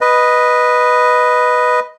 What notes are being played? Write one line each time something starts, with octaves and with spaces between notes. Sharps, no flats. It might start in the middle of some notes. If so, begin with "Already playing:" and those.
B4 D#5